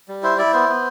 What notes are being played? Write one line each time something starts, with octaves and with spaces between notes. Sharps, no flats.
G3
E4 C5
E4 D5
B3 C5
B3